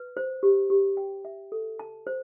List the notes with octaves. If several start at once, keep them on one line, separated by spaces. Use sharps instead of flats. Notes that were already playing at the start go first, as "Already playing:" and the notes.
Already playing: B4
C5
G4
G4
G5
E5
A4
A5
C5